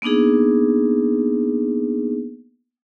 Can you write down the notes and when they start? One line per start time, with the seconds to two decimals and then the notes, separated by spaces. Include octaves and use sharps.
0.02 A#3 B3 D4 D#4 G#4